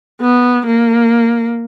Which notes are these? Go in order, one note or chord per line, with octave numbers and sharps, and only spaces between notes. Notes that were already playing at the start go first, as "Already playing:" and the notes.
B3
A#3